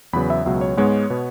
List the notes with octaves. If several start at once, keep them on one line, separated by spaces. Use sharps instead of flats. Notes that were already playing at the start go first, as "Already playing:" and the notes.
E2 C#3 F#3 B3 B5
E5
C#2 B2 F#3 E5
C#5
G#2 G#3 B3 C#5
B2 B3